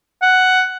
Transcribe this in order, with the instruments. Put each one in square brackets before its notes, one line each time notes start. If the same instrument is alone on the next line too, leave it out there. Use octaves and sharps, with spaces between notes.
[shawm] F#5